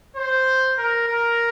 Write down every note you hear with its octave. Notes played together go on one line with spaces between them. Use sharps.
C5
A#4
A#4